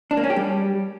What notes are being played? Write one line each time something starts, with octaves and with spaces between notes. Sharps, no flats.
D4
A#3
C#4
G4
G3